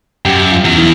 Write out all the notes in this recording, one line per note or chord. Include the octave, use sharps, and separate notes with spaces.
F#2 G4
F4
E2
E4